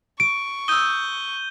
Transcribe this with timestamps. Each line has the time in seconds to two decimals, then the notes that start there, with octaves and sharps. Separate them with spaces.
0.20 C#6 D7
0.68 D#6 E6 G6 D#7 G7